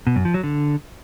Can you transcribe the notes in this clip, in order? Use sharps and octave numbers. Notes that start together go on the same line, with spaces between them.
B2
F#2
F3
F#3
D3